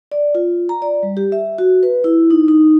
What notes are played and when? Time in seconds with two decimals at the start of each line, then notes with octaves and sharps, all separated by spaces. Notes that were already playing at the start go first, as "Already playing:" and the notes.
0.12 D5
0.35 F4
0.69 A#5
0.82 D5
1.03 G3
1.17 G4
1.32 E5
1.58 F#4
1.83 B4
2.04 E4
2.30 D#4
2.48 D#4